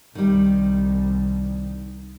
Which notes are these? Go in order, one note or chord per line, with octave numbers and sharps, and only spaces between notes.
C2 D#3 G3